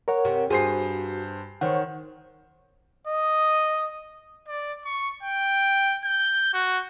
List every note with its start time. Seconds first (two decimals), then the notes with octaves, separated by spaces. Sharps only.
0.08 A#4 C#5 F#5
0.25 C3
0.50 G2 F#4 G#4 C5 C7
1.61 D#3 C5 C#5 F#5
3.07 D#5
4.48 D5
4.85 C#6
5.23 G5
6.05 G6
6.54 F#4